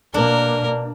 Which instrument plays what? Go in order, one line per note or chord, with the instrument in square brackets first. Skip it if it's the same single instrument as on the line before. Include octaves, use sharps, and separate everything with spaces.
[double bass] B2 A#3 [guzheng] D4 [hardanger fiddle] A#4